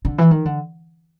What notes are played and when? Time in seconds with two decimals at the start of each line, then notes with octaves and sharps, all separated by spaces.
0.05 D3
0.18 E3
0.31 D#3
0.45 D3